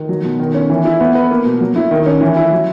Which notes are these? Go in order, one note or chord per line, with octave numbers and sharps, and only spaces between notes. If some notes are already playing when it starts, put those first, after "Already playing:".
Already playing: D#3
F#3
B2
D#3
C#4
E3
E4
B3
B4
A#3
B2
F#3
E4
D#3
C#4
E3
E4
F#3